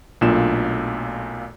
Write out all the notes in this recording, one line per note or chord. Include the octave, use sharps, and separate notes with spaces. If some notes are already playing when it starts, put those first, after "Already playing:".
B1 A#2 A3 D4 F4 E7